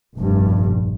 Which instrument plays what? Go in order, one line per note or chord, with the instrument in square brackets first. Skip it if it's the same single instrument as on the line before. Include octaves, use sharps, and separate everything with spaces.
[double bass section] F1 A#1 G2